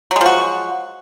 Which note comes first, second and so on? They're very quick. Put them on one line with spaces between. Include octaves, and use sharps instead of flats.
F#3 G#3 F3 F#4